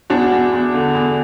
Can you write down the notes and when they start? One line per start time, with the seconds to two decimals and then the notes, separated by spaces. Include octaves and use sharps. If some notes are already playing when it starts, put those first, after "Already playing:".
0.10 E2 D4 F#4
0.32 E2
0.52 E2
0.74 D3
0.95 E2